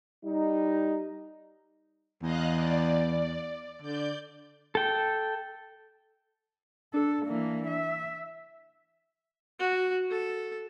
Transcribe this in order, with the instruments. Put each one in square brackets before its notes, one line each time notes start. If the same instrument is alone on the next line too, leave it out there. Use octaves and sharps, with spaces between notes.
[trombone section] G3 D#4
[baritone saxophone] E2 [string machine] D#5 F5 F#6
[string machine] D5
[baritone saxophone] D3 [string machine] D5 G6
[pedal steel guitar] A4 G5
[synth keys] D4 [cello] A4
[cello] E3 A#3
E5
[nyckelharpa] F#4
A4